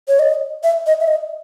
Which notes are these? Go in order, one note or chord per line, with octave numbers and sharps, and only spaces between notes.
C#5
D#5
E5
D#5
E5
D#5